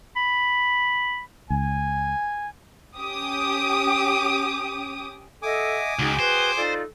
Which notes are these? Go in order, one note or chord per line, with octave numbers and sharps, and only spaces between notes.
B5
C#2 G#5
C#4 G4 D6 D#6
A4 D#5 E5 F#5 G#5 D6 D#6
C#2 D#4 F#4 G#4 G5
B4 C5
D#4 F4 A4 D5